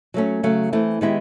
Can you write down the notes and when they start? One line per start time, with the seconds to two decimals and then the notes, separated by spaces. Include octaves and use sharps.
0.14 F#3 A3 C#4
0.43 C#3 F#3 A3
0.73 E3 A3 C4
1.01 D#3 G#3 B3 E4 G4